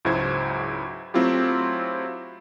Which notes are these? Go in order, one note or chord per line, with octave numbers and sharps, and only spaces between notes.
C#2 G#2 F#3 E4 C5 G#6
F#3 A3 C4 E4 F4 G4